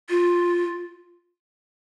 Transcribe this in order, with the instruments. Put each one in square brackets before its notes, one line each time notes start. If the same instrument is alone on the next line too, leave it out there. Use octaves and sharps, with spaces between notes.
[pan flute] F4